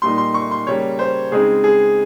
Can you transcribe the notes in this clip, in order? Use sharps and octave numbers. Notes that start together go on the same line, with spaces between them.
A#2 G3 A#3 D#4 C6
C6
C#6
C6
C#3 G3 A#3 C#5
C5
C#3 G#3 C4 D#4 G#4
G#4